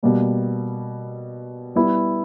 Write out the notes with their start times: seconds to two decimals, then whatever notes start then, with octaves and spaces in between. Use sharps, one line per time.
0.03 B2 G3 A#3
1.75 G3 B3 E4